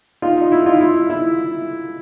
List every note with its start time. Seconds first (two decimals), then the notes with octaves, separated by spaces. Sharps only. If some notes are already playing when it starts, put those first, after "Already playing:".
0.22 D#4 F4
0.41 D#4
0.52 E4
0.66 D#4 F4
0.81 E4
1.10 E4